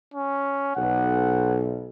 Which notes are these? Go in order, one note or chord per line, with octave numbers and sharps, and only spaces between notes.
C#4
B1 F#5